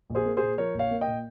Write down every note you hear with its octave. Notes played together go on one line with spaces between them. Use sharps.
A#1
G#4 C5
A#3
A#2 G#4 C5
F3 A#4 C#5
A#1 C#5 F5
A#3
D#5 G5
A#2